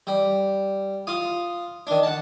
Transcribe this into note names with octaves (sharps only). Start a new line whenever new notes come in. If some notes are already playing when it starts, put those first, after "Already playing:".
G3
F4 D#6
D#3 D4
F#5 A5